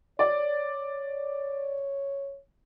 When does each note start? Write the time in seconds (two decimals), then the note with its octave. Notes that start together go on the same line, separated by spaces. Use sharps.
0.19 C#5 D5